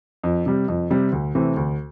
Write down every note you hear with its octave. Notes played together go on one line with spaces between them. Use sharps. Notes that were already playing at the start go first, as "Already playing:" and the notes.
F2
C3 G3
F2
C3 G3
D2
C3 E3 A3 C4
D2